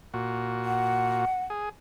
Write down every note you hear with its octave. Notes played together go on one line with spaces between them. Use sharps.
A#2 F#4
F#5
G#4